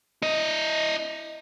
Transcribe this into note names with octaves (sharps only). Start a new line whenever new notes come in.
E4 D#5